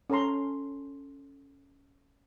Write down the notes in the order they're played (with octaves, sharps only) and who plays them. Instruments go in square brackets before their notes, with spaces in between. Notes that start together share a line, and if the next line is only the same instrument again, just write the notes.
[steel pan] C#4 A4 C#5 A#5 C6